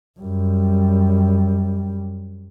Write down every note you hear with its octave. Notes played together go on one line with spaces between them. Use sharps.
F#2 G3